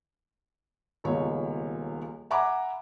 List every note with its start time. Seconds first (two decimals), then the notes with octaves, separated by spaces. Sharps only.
1.04 D#1 C#2 B2 C#5
2.31 E5 F#5 G#5 A#5 B5 D6